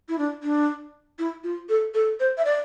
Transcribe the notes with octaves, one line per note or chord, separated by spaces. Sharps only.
E4
D4
D4
E4
F4
A4
A4
C5
E5
D5